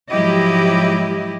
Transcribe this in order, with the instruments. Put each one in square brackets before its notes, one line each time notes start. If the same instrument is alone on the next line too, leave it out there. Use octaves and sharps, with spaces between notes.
[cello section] G#2 F3 F#3 E4 G4 D#5